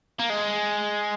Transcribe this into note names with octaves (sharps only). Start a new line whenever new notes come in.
A#3
G#3